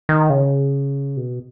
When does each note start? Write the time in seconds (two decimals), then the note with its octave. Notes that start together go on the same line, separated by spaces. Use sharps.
0.09 D#3
0.30 C#3
1.17 B2